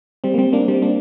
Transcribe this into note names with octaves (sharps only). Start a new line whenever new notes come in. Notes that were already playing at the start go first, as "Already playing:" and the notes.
G3 C4
A#3
G3 C4
A#3 D4
G3 C4
A#3 D4